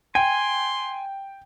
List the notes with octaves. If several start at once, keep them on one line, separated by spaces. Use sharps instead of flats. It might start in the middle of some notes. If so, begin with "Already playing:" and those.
G5 G#5 C6